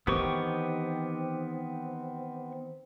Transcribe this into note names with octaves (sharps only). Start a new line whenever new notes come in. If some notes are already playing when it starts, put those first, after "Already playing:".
D#3 E3 B3 C4 G4 C#6